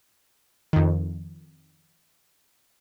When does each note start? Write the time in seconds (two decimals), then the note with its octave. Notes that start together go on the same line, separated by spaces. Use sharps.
0.73 F2 D#3